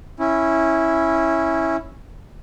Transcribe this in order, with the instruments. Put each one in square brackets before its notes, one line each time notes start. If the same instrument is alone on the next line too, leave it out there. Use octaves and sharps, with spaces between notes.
[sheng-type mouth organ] C#4 E4